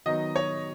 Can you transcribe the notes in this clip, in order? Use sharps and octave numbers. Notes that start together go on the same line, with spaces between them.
D#3 F#3 B3 D#4 D#5
C#5